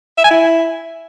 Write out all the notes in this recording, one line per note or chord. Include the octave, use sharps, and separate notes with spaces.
E5
G#5
E4